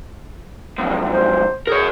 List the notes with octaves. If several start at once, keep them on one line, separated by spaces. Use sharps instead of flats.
B1 F2
C5
G#4 A#4 C#5